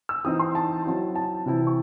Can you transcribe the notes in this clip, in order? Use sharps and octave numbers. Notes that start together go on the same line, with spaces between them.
E6
E3 C4 D#4 D#6
C6
A5
F#3 C4 E4
A5
C3 E3 C4 E4
C#6